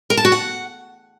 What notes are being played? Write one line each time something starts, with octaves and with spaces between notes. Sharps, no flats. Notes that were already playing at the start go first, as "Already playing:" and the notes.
A#4
A5
F#4
F#5